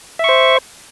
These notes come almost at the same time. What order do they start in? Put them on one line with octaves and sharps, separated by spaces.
E5 C#6 C5